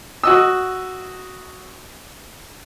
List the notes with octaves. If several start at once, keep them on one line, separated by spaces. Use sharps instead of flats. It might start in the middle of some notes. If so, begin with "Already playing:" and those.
F#4 D#5 E6